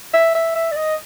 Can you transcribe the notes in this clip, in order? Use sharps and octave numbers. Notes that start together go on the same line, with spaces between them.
E5
E5
E5
D5
D#5